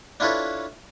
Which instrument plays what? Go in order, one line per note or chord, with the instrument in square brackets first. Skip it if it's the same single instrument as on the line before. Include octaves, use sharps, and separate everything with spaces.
[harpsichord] D4 E4 F4 A4 B4 C#5